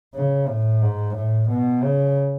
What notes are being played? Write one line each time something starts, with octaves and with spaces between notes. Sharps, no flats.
C#3
A2
G#2
A2
B2
C#3